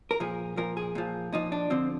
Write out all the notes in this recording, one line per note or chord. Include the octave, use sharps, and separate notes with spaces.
A#4
A#2 F3 G#4
A#2 F3 A#4
G#4
A#2 F3
A#2 F3 D#4
D4
D3 F3 C4